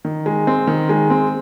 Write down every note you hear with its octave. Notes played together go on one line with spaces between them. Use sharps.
D#3
G#3
C4
D#3
G#3
C4